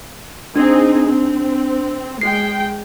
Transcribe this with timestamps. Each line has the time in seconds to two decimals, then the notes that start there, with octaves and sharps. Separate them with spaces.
0.56 C4 D4 D#4 G#4
1.08 C4
2.21 G#3 G5 C7